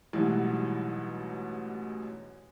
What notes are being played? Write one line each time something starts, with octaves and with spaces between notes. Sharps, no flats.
A1 G#2 B2 E3 F#3 G3